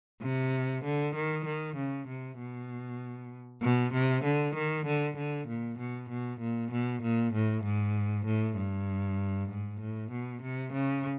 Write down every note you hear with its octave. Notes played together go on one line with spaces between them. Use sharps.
C3
D3
D#3
D#3
C#3
C3
B2
B2
C3
D3
D#3
D3
D3
A#2
B2
B2
A#2
B2
A#2
A2
G#2
A2
G2
G#2
A2
B2
C3
C#3